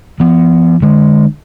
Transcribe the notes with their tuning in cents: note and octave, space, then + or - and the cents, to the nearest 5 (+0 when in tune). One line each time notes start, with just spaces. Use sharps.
F3 -40 B3 +0
D3 +30 G#3 +0